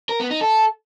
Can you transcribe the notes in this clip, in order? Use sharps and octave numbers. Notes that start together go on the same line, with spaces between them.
A#4
B3
D#4
A4